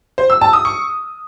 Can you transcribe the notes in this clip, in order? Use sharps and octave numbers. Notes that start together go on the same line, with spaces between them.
C5
E6
A5
D#6
C#6